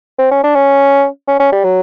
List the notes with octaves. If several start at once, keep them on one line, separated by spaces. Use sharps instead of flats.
C4
C#4
D4
C#4
C#4
C#4
G3
F#3